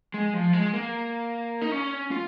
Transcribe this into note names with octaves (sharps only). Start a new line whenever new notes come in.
G#3
F3
G#3
A#3
D#4
C#4
F4